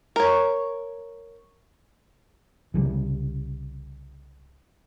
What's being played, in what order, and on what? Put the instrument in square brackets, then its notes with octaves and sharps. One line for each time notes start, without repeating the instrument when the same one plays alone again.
[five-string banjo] A#4 C#5
[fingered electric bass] C2 C#3 E3 G3